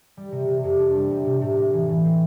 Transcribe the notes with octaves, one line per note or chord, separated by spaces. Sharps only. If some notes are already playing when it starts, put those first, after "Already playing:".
G3
C3
C3
F2
D4
G3
C3
C3
A2
A#3
E3
A2
C4